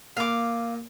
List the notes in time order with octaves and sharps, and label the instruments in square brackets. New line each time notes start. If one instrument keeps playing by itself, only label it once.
[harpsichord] A#2 [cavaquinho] F5 D6